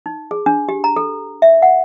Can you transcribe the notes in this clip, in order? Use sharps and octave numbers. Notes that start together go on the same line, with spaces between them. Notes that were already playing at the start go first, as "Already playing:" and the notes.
D#4
G#4
D4
G4
A#5
A4
E5
F#5